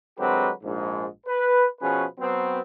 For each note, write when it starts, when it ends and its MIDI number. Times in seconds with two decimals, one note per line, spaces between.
0.18 0.49 50
0.18 0.49 54
0.18 0.49 56
0.18 0.49 60
0.18 0.49 67
0.18 0.49 71
0.62 1.05 34
0.62 1.05 44
1.26 1.65 71
1.80 2.04 47
1.80 2.04 53
1.80 2.04 61
1.80 2.04 68
1.80 2.04 71
2.19 2.60 54
2.19 2.60 59
2.19 2.60 60